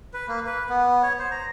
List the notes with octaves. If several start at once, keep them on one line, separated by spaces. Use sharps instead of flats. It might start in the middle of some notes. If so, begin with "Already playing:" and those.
B4
A#3
B4
B3
C#5
C5
A#5